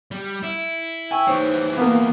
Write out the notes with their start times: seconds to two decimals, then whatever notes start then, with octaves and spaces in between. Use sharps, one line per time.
0.11 G3
0.43 E4
1.11 G5 G#5 C#6 E6
1.27 E3 G3 D#4 C5 C#5
1.77 A#3 B3 F5